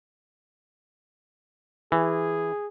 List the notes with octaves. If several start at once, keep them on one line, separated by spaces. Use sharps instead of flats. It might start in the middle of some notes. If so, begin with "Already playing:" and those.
E3 G#4